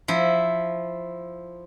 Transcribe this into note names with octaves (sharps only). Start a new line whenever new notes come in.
F3 E4